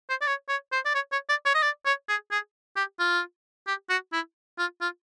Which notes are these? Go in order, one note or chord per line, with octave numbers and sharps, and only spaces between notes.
C5
D5
C#5
C#5
C5
D5
C#5
C#5
D5
C#5
D#5
D5
C#5
G#4
G#4
G4
F4
G4
F#4
E4
F4
F4